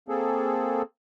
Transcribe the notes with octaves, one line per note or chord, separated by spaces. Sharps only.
A#3 C4 G#4 A4